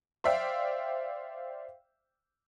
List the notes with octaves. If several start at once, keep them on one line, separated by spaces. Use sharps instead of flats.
C5 D5 E5 F5 G5